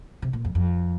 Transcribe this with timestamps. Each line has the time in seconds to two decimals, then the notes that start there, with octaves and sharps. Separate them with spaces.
0.22 C3
0.33 A#2
0.45 F2
0.55 F2